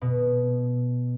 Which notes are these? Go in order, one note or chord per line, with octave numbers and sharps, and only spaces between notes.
B2